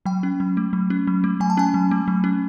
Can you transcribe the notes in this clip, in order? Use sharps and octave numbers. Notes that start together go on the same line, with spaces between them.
F#3 G5
C#4
F#3
A3
F#3
C#4
F#3
A3
F#3 G#5
A5
C#4 G#5
F#3
A3
F#3
C#4